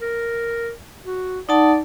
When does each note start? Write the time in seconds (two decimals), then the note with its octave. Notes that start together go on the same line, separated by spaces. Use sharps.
0.01 A#4
1.05 F#4
1.49 D#4 D5 F#5 A5